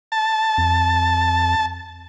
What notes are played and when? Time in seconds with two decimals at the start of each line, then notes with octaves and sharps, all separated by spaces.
0.12 A5
0.58 F2